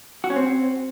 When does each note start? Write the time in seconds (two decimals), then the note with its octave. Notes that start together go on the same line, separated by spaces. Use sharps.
0.24 F#4
0.30 C#4
0.36 C4